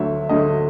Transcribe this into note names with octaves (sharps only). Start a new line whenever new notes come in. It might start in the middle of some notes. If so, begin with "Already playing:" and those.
Already playing: D2 D3 F#3 E5
D2 D3 F#3 D#5